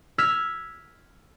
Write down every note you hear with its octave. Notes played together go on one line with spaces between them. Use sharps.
E6 F6 G#6 B6